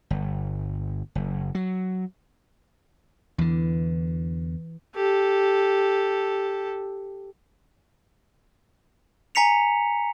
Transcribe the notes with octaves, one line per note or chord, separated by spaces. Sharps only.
G1
F#1
F#3
E2 D3 E3
G4 A4
G#5 A#5 B6 C#7 F7